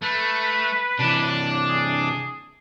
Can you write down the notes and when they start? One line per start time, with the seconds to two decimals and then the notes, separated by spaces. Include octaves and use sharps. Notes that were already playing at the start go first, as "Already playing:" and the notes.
0.03 A3 B4
0.99 C3 E3 D4
1.69 G#4